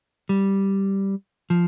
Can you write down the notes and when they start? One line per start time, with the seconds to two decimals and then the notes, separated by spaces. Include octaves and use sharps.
0.29 G3
1.50 F3